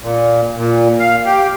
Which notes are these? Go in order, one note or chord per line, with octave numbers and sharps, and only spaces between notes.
A#2
A#2
F5
G4